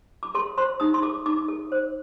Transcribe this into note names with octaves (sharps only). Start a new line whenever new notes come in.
D6
A4 C6
C5 C6
D#4 D#6
C6
A4 D6
D#4 D6
A4
C5